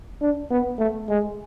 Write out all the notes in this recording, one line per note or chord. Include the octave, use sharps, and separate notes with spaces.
D4
B3
A3
G#3